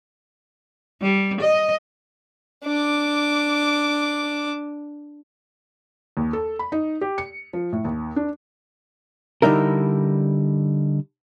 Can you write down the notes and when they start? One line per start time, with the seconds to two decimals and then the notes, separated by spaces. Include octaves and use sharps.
1.02 G3
1.41 D#5
2.65 D4 D6
6.17 D#2
6.33 A4
6.59 B5
6.72 D#4
7.01 G4
7.18 C#7
7.53 F3
7.72 A2
7.85 D#2
8.16 D4
9.42 D3 G3 D#4 E4 A#4